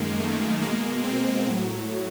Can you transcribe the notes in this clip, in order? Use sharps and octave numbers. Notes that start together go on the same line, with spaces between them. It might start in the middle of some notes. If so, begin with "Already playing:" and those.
Already playing: F#2 D#3 G#3 A#3
A3
B2 G#3 A#3
C4
A2 F#3